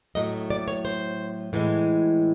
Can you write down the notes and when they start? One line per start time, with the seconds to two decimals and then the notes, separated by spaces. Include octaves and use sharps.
0.15 A2 F#3 A3 D#5
0.50 D5
0.68 C#5
0.85 C5
1.53 A2 E3 G#3